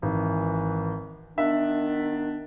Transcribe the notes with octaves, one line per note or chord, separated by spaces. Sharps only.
G#1 E3
D#3 B3 D4 E5